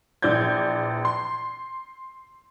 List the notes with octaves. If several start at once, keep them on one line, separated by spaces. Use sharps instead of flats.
A#1 E3 D5 G6 G#6
C6